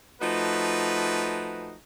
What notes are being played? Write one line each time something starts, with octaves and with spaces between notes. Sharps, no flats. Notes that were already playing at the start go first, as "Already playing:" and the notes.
F3 A3 D#4 F#4 B4